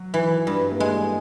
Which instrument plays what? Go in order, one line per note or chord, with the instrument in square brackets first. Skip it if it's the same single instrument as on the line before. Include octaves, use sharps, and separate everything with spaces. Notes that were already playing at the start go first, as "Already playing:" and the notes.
Already playing: [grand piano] F#3
[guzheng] E3
[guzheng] G2 [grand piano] G3
[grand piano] A#3
[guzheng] G#3 [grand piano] A3